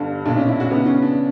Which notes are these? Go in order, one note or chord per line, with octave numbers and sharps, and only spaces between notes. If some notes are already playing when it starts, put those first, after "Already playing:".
Already playing: G1 G2 D3
B1 A#2 D4
C#4
E4
F#4
C#2 C#3 E3 B3
C#4
D4